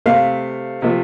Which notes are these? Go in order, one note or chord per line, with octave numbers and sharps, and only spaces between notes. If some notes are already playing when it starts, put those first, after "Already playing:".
C3 A3 C4 F5
C3 F3 A3